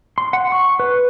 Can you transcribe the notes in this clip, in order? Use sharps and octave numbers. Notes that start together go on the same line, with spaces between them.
C6
F#5
C#6
B4